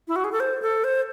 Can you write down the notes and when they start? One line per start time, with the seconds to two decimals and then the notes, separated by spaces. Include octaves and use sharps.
0.08 E4
0.16 F#4
0.24 G#4
0.32 A4
0.40 C5
0.62 A4
0.84 C5